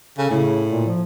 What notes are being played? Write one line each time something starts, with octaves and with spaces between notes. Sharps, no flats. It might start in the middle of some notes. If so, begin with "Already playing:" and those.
C#3 A4
A2 C#3
A#2
F3